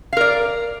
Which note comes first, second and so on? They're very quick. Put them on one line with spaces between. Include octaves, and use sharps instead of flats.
F5 A#4 D5